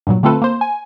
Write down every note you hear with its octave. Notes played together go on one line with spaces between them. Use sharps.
G2 A#2 F#3
D3 A3 C4 F4 A4 B4
A#3 C5
G#5